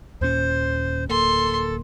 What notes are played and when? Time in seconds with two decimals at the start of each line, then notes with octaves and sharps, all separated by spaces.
0.21 D#2 A#2 C#4 C5
1.09 D1 A#3 A4 C6